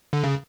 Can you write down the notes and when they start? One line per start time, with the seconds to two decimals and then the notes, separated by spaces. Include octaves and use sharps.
0.13 D3
0.24 C#3